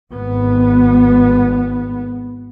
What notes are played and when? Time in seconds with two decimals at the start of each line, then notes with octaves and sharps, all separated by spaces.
0.12 G#1 B3